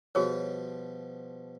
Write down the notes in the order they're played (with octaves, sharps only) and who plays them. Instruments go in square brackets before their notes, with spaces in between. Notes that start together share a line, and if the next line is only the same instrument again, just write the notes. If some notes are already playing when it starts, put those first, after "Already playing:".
[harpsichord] B2 F3 G3 [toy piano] F#4 G#4 C#5